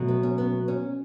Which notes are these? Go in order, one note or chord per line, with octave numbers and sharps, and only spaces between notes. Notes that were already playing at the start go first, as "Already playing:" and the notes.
Already playing: B2 F#3 A3
B3
C#4
B3
C#4